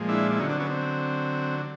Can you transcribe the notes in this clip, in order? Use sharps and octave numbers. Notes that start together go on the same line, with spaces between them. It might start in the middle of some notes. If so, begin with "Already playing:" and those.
Already playing: A#2 F3 G#3
D4 E4
E4
D3 F#3 C#4 D#4
C4 D4
B3 C#4
C4